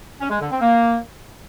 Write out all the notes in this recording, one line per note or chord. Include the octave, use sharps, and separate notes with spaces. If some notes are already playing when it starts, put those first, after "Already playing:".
C#4
G#3
D3
C4
A#3